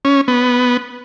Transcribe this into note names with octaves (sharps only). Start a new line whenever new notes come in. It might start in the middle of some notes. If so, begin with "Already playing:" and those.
C#4
B3